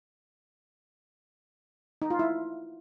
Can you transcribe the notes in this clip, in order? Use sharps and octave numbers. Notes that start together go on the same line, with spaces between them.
D#4
F4
E4